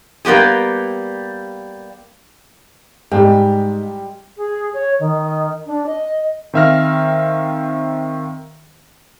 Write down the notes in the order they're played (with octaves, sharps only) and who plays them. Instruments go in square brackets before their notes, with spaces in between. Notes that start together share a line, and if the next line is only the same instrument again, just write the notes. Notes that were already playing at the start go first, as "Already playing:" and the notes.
[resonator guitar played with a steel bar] G3 A#3 B3 G4 G#4
[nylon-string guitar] G#2 [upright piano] G3 G#3 G4
[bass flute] G#4
C#5
D#3
D4
D#5
[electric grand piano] D#3 C4 E5 F5 F6 A#6